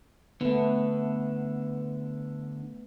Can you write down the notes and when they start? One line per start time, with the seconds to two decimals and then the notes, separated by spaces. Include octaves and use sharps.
0.41 D3 A3 B3